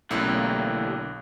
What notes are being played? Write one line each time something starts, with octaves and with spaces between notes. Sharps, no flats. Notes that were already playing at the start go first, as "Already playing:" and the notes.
B1 D3 E3 A3 A#3 C#4 G4